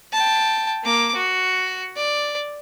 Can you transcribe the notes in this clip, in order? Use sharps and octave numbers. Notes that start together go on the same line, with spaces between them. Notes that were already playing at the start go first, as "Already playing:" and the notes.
G5 A5
A#3 D6
F#4
D5